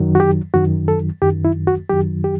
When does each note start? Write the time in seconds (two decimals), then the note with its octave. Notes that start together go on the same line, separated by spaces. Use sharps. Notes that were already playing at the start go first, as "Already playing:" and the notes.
Already playing: F#2 D#3 F#3
0.15 F#4
0.20 G4
0.54 F#2 D#3 F#3 F#4
0.88 A4
1.22 F#2 D#3 F#3 G4
1.45 E4
1.67 F#4
1.89 F#2 D#3 F#3 G4
2.24 G4